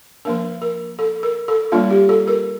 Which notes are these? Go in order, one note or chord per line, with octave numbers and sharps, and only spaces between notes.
F3 A#3 D4 A#4
A#4
A4
A#4
A4
G3 A#3 D4 F4
G4
A4
A#4